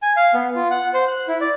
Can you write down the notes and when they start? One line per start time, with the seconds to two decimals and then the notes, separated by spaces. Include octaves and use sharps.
0.02 G#5
0.17 F5
0.34 B3
0.55 F4
0.71 F#5
0.94 C5
1.08 F#6
1.28 E4
1.41 D5